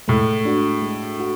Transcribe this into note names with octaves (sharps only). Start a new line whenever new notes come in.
A2 G#3
D4 F#4
G#3
F#4